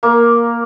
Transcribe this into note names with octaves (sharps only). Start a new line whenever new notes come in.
A#3